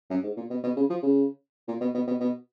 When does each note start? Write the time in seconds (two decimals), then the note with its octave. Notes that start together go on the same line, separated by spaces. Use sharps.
0.10 F#2
0.23 G#2
0.37 A#2
0.50 B2
0.63 B2
0.76 C#3
0.90 F3
1.02 C#3
1.68 A#2
1.81 B2
1.94 B2
2.07 B2
2.20 B2